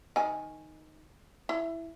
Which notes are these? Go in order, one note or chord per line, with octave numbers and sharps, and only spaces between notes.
D#3 G#5
E4